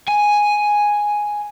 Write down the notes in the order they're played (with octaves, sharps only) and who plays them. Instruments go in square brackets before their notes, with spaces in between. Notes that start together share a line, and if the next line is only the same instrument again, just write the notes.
[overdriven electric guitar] G#5